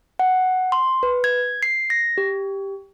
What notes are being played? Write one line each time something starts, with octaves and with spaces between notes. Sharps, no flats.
F#5
C6
B4
G#6
C7
A#6
G4